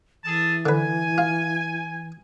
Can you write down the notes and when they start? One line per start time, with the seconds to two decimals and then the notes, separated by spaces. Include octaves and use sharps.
0.24 E3 G#4 A4 A5
0.66 D3 B4 G#5
1.18 F4